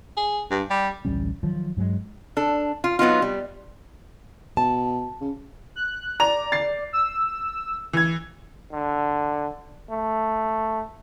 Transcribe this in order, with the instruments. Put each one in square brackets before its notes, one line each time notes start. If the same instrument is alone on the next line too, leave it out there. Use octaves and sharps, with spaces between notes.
[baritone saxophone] G#4
G2
G3
[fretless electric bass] A1 D2 G3 C#4
D#3 F3 F#3
G2 F#3 G#3
[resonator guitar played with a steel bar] D4 A4
F4
F#3 B3 D#4 F4
G3
[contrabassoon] B2 [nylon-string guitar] A5
[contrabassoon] C#3
[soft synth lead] F#6
[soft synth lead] D5 [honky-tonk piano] A#5 F7
[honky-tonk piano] A6 C7
[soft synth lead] E6
[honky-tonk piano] E3 G#6
[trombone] D3
A3